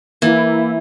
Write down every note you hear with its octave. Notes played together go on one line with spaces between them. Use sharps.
E3 A#3 E4